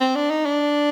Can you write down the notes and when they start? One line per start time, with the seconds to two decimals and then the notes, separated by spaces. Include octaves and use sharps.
0.01 C4
0.15 D4
0.30 D#4
0.45 D4